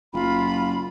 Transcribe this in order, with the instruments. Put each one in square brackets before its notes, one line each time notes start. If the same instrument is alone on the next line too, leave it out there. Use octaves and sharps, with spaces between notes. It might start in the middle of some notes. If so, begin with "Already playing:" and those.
[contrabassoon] F#1 [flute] F4 [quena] B5